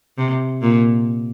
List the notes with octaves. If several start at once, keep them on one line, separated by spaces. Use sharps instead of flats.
C3
A#2